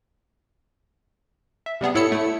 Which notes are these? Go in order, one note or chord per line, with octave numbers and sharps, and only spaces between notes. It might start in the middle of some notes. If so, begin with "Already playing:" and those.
E5
C3 G3 B3 G#4
A2 E4 A4 C#5 E6 C#7
A3 E4